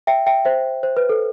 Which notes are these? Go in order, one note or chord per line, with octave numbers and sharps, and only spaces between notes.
E5 G5
E5 G5
C5 E5
C5
B4
A4